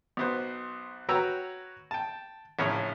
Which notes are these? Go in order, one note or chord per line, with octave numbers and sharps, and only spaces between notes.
B1 B3 C5
F#4 B4 C#5 G5 A#5 E6
G5 A5
A#1 A2 C#3 C#5